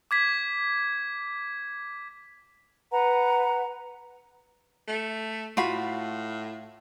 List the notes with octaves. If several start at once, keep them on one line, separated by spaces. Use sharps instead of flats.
D6 G#6 B6
B4 F#5 A#5
A3
A2 F4 F#4 B5